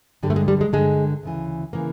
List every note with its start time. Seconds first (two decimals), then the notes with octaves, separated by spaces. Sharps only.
0.23 G2 D3 G3
0.30 A3
0.36 G#3
0.48 G3
0.61 G#3
0.73 G2 D3 G#3
1.23 D2 C#3 E3
1.73 C#3 E3 A#3